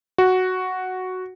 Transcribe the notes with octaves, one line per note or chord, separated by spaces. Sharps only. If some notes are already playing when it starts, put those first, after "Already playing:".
F#4